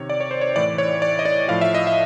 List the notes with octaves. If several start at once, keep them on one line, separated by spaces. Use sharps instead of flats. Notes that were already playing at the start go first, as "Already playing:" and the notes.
Already playing: C3 D#3 C#5
D5
C#5
C5
C#5
A2 E3 D5
C#5
D5
D#5
D5
A2 F3 F5
E5
D#5
E5